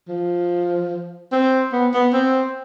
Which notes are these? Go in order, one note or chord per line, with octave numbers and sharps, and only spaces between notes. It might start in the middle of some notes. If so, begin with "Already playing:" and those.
F3
C4
B3
B3
C4